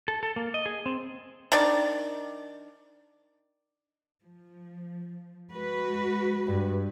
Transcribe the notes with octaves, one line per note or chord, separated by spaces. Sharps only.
A4
A4
A#3
D#5
G#4
C4
D#3 D4 D5
F3
G#3 F#4 B4
G2